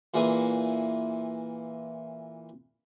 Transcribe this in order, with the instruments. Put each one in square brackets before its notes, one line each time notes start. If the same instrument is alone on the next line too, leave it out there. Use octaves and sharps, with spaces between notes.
[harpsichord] A#2 E3 G#4